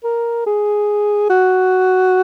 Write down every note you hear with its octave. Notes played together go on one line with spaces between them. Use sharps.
A#4
G#4
F#4